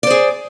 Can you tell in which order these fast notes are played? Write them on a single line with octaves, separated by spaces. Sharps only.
D5 C5 G#4